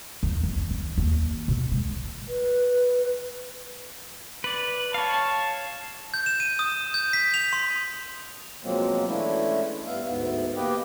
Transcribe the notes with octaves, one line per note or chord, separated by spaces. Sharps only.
E2
E2
E3
D#3
D#2
B2
G#3
B4
B4 D5
C#5 F5 A5
G6
E7
D#7
D#6
G6
B6
F7
C6
B2 F3 F#3 G#3 A#3 C4
E3 G#3 A3 C#4 D4 E4
G2 B3 E5 F5
D2 G#2 B3
A#3 B3 G4 B4 D#5 G5